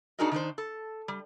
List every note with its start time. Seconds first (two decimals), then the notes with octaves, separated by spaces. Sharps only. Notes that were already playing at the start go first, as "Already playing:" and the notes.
0.19 D4 D#4 F#4 G#4 A#4 D#5
0.31 D#3 D4 D#4 C5
0.58 A4
1.08 G3